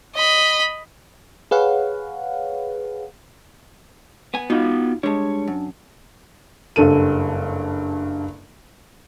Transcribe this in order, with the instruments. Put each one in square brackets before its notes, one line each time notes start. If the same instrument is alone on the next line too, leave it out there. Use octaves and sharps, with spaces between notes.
[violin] D#5 B5
[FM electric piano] G#4 B4 C#5 F5 F#5
[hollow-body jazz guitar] B3 G#5
[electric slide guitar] B3 F5 F#5 [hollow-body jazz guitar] D#4 F4 [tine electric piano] F#4
[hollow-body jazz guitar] G3 G#3 [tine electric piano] D4 A5 [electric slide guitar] C#5
[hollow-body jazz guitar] F#2
[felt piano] F#1 G2 A4 D#7